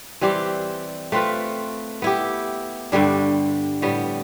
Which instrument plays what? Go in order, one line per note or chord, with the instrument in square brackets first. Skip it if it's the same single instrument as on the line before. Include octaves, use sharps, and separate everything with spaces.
[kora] E3 G3 C4 G4
A3 C4 F4 B4
B3 E4 G4
G2 D3 G3 D4
A2 G3 B3